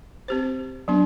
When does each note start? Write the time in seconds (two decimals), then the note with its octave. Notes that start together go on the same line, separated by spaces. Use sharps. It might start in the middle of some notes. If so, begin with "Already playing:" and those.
0.28 C4 G4 C5
0.88 F#3 B3 D4